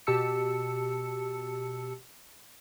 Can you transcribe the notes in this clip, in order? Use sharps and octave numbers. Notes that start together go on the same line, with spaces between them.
B2 G4 A5 E6 C#7